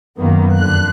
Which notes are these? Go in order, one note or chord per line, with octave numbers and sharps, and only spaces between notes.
F#2 D#3 A#3 B3
F2 D3 F#6